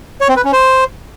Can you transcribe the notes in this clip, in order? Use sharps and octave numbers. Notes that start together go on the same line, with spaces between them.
C#5
C4
B4
C#4
C5